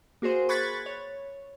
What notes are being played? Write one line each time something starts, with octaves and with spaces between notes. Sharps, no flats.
A#3 F#4 G#4 C5
B5 C#6 F#6 G#6 A6 B6
C#5